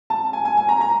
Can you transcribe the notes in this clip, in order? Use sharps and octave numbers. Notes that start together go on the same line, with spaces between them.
A5
G#5
G#5
G#5
A#5
A#5